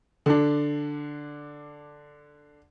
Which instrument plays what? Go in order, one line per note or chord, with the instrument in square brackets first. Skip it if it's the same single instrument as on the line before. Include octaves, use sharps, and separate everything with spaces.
[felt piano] D3 D4